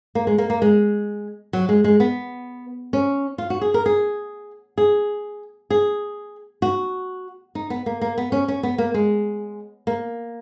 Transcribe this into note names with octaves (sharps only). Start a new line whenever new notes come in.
A#3
G#3
A#3
A#3
G#3
F#3
G#3
G#3
B3
C#4
F4
F#4
G#4
A#4
G#4
G#4
G#4
F#4
D#4
B3
A#3
A#3
B3
C#4
C#4
B3
A#3
G#3
A#3